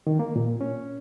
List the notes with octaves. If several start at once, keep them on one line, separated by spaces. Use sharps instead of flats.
D#3
A#3
A#2
C#4